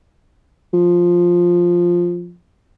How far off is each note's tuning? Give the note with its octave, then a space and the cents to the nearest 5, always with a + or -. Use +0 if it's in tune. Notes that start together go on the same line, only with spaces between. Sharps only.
F3 +5